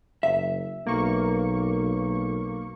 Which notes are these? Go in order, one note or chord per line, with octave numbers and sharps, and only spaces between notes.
F#1 E5
B1 A#3 C#6